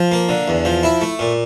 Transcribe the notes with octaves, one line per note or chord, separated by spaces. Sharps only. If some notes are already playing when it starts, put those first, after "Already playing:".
Already playing: F3
A#3
D3
E2
F3
E4
A3
A#2